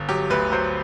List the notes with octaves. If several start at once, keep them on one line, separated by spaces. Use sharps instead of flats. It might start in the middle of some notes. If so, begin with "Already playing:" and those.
Already playing: G1
F#3 G4
D2 B4
F#3 C5